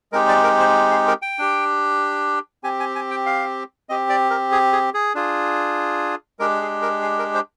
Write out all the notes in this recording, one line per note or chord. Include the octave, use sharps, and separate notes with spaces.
G#3 C4 D#4 G4 A#4
D5
A#4
C5
G#4
A#4
G5
D4 G4
C4 G4 G#5
G#5
G#5
G5
F5
C4 G4 D#5
D5
A#4
G#4
G#4
G#4
D4 F4 G#4
G#3 D4 G4 A#4
G#4
A#4
G#4
A#4
C5